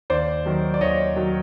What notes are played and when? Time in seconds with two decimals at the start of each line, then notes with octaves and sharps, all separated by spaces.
0.10 D#2 C5 D5
0.46 D#3 F#3
0.74 D5
0.81 D#2 C#5 D#5
1.16 D#3 F#3